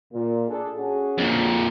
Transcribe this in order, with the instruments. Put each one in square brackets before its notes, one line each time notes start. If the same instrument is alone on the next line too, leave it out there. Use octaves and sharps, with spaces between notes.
[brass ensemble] A#2
D4 G#4 A4
C#4 F#4 G#4
[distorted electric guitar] F2 A#2